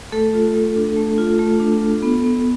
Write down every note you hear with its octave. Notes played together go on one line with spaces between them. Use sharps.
A3 A4
F4
A3
D4
A3
F4
A3
D4
F4
B3
B3